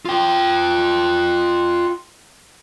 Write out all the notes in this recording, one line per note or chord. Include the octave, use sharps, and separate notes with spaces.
F4 G5